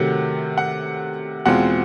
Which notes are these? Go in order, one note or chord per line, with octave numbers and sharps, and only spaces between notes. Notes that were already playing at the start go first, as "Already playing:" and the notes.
Already playing: C3 D#3 F#3 A3 F#5
F#5
E2 B2 G#3 C4 F4 F#5